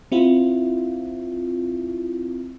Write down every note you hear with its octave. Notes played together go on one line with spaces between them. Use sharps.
C4 E4 F4